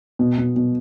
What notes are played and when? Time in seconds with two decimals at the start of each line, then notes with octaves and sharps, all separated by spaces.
0.19 B2
0.38 B2
0.56 B2